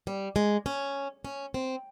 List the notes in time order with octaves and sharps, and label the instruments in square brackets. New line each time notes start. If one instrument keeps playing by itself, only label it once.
[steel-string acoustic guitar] G3
G#3
C#4
C#4
C4